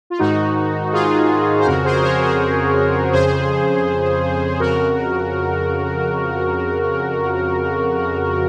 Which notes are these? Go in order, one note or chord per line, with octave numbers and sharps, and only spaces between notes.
F4
G#2 D#3 D#4 F#4
F4 G#4
C5
F2 C#3 F#4 A#4
G#4 C5
A#4 C#5
G#4 C5
F2 C#3 G#4 C5
F2 C#3 F#4 A#4